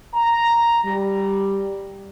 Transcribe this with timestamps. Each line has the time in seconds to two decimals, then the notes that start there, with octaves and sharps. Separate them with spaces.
0.14 A#5
0.84 G3